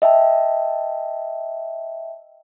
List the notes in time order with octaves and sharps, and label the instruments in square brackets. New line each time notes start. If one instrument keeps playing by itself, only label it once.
[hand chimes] D#5 E5 G5 A5